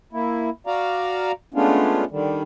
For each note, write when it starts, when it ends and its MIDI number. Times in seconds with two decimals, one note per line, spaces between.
0.13 0.50 58
0.13 0.50 64
0.67 1.32 66
0.67 1.32 74
0.67 1.32 77
0.67 1.32 82
1.54 2.04 56
1.54 2.04 57
1.54 2.04 59
1.54 2.04 61
1.54 2.04 62
1.54 2.04 65
2.11 2.43 50
2.11 2.43 51
2.11 2.43 55